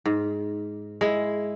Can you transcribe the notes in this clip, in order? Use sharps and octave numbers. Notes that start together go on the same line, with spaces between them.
G#2
G#3 E4